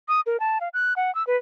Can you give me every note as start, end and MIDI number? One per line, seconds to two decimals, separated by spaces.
0.08 0.21 87
0.26 0.40 70
0.40 0.58 81
0.61 0.69 77
0.74 0.94 90
0.96 1.13 78
1.15 1.25 88
1.27 1.37 71